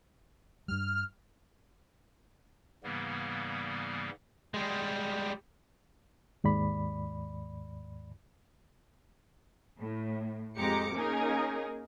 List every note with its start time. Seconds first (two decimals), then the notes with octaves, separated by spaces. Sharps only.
0.68 G2 G3 F6
2.84 G#2 C#3 E3 G3 A#3 B3
4.54 G3 G#3
6.44 D#2 G#2 D5 B5
9.80 A2
10.56 F2 G#3 G4 A#5 D6 C#7
10.94 A#3 C#4 D#4 G#4 A#4